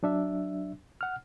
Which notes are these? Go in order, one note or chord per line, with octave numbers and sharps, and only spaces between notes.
F#3 D4 E5
F#5 F6